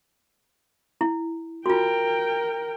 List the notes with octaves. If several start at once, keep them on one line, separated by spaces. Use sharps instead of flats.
E4
F4 F#4 A#4 G5